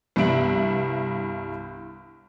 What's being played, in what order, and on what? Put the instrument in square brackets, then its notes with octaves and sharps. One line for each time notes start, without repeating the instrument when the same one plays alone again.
[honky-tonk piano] C2 G2 B3 E5 D7 F#7